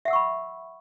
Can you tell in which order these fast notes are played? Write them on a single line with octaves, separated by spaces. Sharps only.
E5 F#5 E6 C#6 B5